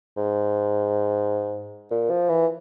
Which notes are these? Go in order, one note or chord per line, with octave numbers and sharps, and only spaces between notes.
G#2
A#2
F3
E3